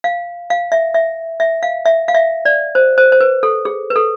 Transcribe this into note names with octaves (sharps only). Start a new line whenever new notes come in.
F5
F5
E5
E5
E5
F5
E5
F5
E5
D5
C5
C5
C5
B4
A4
G#4
B4
A4